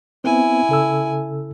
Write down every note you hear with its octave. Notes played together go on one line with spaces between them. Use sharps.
B3 C4 E4 G#5
C#3 A4 E6